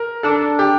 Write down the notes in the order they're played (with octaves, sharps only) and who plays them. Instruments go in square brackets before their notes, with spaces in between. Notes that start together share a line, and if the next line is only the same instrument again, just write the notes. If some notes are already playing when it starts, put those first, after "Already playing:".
Already playing: [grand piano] A#4
[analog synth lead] D4 [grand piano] A4
[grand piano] G4